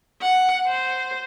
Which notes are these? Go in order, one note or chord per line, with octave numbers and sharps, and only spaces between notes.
F#5
C5